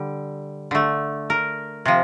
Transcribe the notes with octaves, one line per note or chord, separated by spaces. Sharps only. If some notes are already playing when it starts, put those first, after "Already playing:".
Already playing: D3 G3
D3 A3
A#4
C3 F3